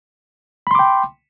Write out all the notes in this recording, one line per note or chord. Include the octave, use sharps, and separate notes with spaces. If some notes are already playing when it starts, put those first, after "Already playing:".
G5 B5 C6 D6